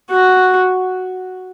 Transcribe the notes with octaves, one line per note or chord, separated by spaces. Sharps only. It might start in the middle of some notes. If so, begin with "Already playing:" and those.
F#4